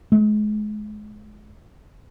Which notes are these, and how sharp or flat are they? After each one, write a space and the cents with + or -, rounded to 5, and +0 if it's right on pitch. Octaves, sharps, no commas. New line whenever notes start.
G#3 +30